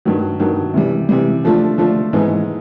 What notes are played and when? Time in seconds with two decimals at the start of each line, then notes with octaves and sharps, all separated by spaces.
0.05 G2 D#3 F#3
0.40 G2 D#3 F#3
0.74 C3 E3 G3
1.09 C3 E3 G3
1.44 D3 F3 A3 D4 F4
1.78 D3 F3 A3 D4 F4
2.13 G#2 E3 G#3 B3 D#4